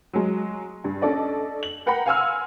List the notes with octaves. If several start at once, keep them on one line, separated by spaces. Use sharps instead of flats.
F#3 G#3
G2
C#4 D4 A4 D5 D#5
F#7
A#4 B4 F#5 G5 A#5 B5
F5 F#5 G#5 C6 E6 F6